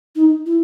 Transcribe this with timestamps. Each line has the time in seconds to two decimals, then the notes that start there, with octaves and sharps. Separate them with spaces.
0.16 D#4
0.46 E4